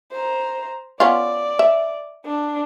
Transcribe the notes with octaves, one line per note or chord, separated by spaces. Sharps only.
C5 A#5
B3 C#4 F4 D5
E5
D4